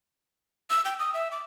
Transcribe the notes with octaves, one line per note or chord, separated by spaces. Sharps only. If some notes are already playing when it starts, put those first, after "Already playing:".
E6
G5
D#6
E5
D6